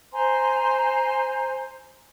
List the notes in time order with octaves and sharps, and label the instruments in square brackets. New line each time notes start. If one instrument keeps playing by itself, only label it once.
[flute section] C5 G#5 A#5 C6